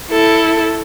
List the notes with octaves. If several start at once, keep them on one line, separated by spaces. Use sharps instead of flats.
E4 A4